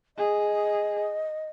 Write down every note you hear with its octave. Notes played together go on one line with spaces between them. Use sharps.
G#4 D#5